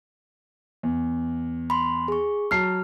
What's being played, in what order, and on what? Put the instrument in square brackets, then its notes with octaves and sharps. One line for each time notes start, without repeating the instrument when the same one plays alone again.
[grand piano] E2
[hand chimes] B5 C6
G#4 C#6
[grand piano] F#3 A5 C7 [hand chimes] F6